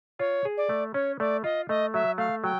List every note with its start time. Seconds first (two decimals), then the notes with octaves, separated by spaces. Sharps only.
0.19 F4 C#5
0.45 G#4
0.57 D5
0.69 A3
0.94 C#4 C#5
1.20 A3 D5
1.44 F4 D#5
1.69 A3 D#5
1.94 F#3 E5
2.18 A3 F5
2.44 F#3 G5